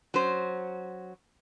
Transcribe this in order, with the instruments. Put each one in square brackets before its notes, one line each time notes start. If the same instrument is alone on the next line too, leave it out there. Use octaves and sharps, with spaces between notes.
[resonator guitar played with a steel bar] F#3 C#4 C5